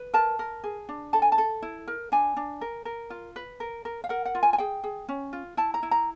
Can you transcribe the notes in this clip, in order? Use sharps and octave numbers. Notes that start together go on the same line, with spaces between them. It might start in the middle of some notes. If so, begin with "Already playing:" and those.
Already playing: B4
A#4 A5
A#4
G#4
D4
A4 A5
G#5
A5
A4
E4
A#4
D4 G#5
D4
A#4
A#4
F4
B4
A#4
A#4
F5
A#4 F#5
F#5
F4
G#5
G#5
G#4 G5
G#4
C#4
F4
E4 A5
A#5
E4
A#5